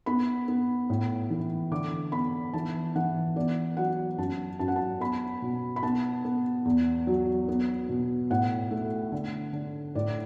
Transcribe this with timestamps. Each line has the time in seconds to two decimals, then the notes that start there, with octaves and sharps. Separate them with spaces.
0.06 B3 B5
0.48 B3
0.90 A2
1.30 E3
1.71 D3 D6
2.12 B3 B5
2.53 E3 A5
2.96 E3 F#5
3.36 B3 D5
3.77 F#3 F#5
4.18 F#2 A5
4.59 F#2 A5
4.68 F#5
4.76 A5
5.00 B3 B5
5.42 B2
5.76 B5
5.83 B3 A5
6.25 B3
6.65 E2
7.07 F#3
7.48 B3
7.89 B2
8.30 A2 F#5
8.71 A3
9.12 D3
9.53 D3
9.95 A2 D5